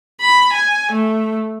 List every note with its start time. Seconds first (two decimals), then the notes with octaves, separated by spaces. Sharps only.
0.21 B5
0.53 G#5
0.92 A3